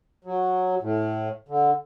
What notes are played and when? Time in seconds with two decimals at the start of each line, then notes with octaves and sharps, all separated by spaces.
0.25 F#3
0.81 A2
1.48 D3